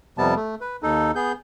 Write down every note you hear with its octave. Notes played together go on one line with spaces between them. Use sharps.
F2 C3 G3 B3 A5
A3
B4
D#2 D#4 A4
B3 G#4 G6